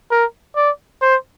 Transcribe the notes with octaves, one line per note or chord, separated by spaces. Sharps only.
A#4
D5
C5